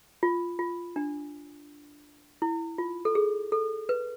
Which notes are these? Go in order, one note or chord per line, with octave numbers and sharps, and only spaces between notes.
F4
F4
D4
E4
F4
A4
G#4
A4
B4